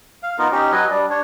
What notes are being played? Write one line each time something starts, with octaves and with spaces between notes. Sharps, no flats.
F5
B3 D#4 F4 A#4
C#4 D#4 G4
F#3 B4 D#5 G#5
G3 D4 D5
D4 C#5